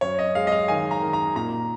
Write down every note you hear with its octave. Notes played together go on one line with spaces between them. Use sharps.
F#2 C#5
D#5
G#3 F5
D#5
F5
D#3 G#5
A#5
D#3
A#5
A#2 A#5